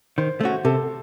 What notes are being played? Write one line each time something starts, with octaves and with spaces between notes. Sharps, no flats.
D#3 C5
A3 C#4 F#4
C3 A4